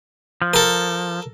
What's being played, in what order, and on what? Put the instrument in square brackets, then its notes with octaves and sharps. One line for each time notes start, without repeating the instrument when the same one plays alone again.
[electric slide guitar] F3
[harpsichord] A4 A#4